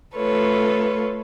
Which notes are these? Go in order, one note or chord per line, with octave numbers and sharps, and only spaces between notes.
A3 F4 A4 B4 C#5